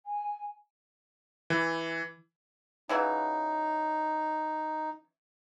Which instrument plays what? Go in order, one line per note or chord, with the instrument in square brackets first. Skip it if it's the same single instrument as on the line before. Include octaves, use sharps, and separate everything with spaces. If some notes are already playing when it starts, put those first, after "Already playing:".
[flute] G#5
[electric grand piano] E3
[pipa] C#3 E3 F#3 [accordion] D#4